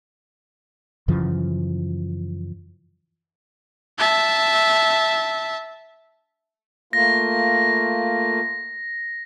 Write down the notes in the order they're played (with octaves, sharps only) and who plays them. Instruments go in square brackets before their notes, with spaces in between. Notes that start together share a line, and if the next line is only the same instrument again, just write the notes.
[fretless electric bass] F#2 C#3 E3 F3
[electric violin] E5 A5
[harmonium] A3 A#3 F4 [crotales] A#6